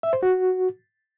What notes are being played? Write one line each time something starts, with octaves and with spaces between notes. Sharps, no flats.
E5
C5
F#4